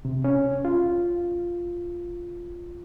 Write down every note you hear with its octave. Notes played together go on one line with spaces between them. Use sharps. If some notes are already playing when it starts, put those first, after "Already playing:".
C3
C#4
F4